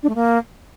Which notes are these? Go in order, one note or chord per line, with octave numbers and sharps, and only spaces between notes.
D4
A3
A#3